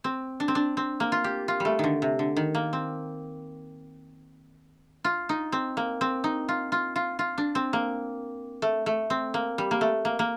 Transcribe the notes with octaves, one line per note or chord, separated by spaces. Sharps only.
C4
D4
C4
D4
C4
A#3
F4
G4
F4
G3
A3
D3 D#3
C3
D3
D#3
A#3
C4
F4
D#4
C4
A#3
C4
D#4
F4
F4
F4
F4
D4
C4
A#3
A3
A3
C4
A#3
G3
A#3
A3
A#3
A#3